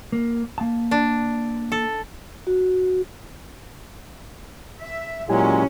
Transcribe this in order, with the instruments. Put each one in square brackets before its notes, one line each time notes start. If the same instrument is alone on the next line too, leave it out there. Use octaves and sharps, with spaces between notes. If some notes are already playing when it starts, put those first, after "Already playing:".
[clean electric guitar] A#3
A#3 A5
[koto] D4
A4
[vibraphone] F#4
[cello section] E5
[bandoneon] A#2 F#3 G#3 [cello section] C#4 [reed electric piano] E4 G4 G#5